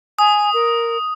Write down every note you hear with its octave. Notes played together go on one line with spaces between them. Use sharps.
G#5 D#6
A#4